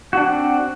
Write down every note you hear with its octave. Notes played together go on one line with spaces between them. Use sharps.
C4 D4 F#4